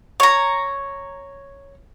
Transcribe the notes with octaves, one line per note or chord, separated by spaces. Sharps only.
C#5 A#5